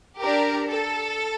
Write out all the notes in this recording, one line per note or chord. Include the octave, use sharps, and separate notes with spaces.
D4 G4 A#4
A4